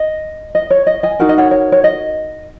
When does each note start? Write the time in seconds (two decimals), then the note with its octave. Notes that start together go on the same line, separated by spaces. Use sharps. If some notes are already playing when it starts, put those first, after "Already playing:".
Already playing: D#5
0.55 D#5
0.70 C#5
0.87 D#5
1.03 D#5 G#5
1.19 D#4 F#4 A#4 F#5
1.29 D#5
1.38 C#5 F#5
1.51 C#5
1.72 C#5
1.84 D#5